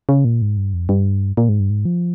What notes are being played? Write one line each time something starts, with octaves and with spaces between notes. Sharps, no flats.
C#3
A#2
G#2
G2
F2
G2
A#2
G#2
G2
G#2
F3